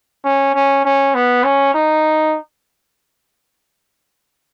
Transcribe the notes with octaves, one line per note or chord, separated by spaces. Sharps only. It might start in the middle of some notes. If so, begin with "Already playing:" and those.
C#4
C#4
C#4
B3
C#4
D#4